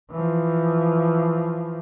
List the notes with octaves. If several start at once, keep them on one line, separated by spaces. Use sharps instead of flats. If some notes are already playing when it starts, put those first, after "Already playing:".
E3 F3